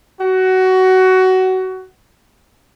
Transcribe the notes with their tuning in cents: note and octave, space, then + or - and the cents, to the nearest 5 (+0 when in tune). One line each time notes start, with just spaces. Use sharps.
F#4 +20